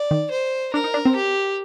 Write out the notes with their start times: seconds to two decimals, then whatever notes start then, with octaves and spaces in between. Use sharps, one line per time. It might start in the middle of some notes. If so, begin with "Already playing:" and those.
Already playing: D5
0.11 D#3
0.31 C5
0.74 D4 A#4
0.84 D#4
0.94 D4
1.05 C4
1.15 G4